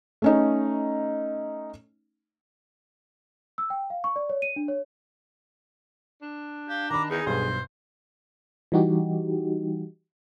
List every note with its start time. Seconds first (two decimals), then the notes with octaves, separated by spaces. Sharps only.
0.22 A3 C#4 D#4
3.58 E6
3.70 G5
3.90 F5
4.04 C#6
4.16 D5
4.30 C#5
4.42 D#7
4.56 D4
4.68 C#5
6.21 D4
6.69 G4 F5
6.90 D#3 A#5 B5 D6
7.10 E2 D#4 G#4
7.26 B1 G2 D3 C5
8.72 E3 G3 D#4 F#4 G4